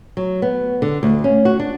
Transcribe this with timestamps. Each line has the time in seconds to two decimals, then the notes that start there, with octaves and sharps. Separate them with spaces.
0.17 F#3
0.42 B3
0.82 D3
1.03 D2
1.24 C#4
1.45 F#4
1.60 D4